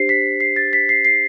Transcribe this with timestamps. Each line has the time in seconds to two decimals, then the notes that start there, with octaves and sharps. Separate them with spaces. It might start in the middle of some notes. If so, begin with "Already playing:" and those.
Already playing: D4 G4 C5 C7
0.09 B6
0.40 C7
0.56 A6
0.73 B6
0.89 C7
1.05 C7